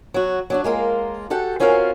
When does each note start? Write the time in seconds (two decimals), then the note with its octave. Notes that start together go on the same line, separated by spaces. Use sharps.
0.14 F#3 F#4
0.50 F#3 D4 F#4
0.64 G#3 A#3 F4 A#4
1.30 F#4 G4 A4 F#5 G5
1.60 C4 C#4 F4 F#4 A#4 F5